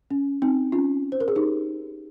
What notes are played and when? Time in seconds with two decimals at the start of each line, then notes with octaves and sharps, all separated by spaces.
0.10 C#4
0.42 C4 D#4
0.72 C#4 F4
1.12 C5
1.20 A#4
1.28 G#4
1.35 D#4 G4